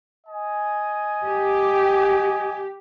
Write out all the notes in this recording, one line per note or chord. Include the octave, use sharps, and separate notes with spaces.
D#5 G#5
G4